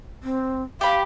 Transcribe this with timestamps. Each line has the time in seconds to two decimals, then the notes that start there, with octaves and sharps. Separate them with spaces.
0.23 C4
0.81 G4 F5 B5